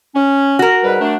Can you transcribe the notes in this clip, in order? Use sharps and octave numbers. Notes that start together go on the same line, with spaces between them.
C#4
F#4 A#4
G#2 G3 B4
F#3 A3 D4